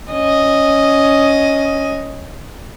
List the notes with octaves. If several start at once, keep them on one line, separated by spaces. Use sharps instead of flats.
C#4 D#5